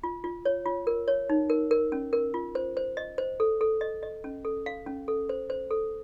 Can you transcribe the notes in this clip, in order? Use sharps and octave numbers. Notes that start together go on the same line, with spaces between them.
F4
F4
C#5
F4
A#4
C#5
D#4
A#4
A#4
C#4
A#4
F4
C5
C5
D#5
C5
A4
A4
D#5
D#5
C#4
A4
F5
C#4
A4
C5
C5
A4